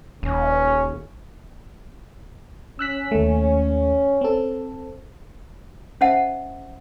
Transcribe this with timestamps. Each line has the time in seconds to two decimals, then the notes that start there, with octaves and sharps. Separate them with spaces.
0.23 D#1 C#4
2.79 C#4 E6 F#6 B6
3.12 D#2 A3
4.21 C4 A4
6.01 C#4 C5 D#5 E5 F#5 A5